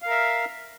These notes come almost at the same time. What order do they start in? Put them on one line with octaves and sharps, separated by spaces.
F5 A#4 E5